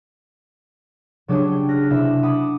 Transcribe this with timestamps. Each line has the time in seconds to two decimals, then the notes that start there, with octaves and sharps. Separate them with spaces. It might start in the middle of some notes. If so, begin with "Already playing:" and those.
1.28 C#3 F#3 D4 G4 G#4 C#5
1.52 G5
1.68 F6 F#6 A#6
1.90 C3 D4 E4 E5 B5 E6
2.23 F#5 B5 D6 D#6